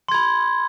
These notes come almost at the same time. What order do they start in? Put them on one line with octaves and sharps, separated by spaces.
C6 G#6 B5